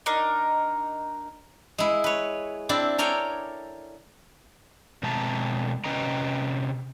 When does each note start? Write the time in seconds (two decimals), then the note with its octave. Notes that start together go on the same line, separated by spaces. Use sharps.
0.06 D4 D#4 A#4
1.78 G#3 E4
2.04 B4 C#5
2.69 C4 D4 E4 D5 A5
2.98 A4 A#4 C#5 D5 G5 G#5
5.03 B2 G#3 C4 E5 A5 A#5
5.84 C3 C#4 B4 D#5 G5 A#5